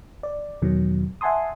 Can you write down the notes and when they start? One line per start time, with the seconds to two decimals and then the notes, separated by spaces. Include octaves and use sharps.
0.23 D5
0.62 E2 B2 D#3 F#3
1.21 E5 F#5 G#5 A5 C6 D#6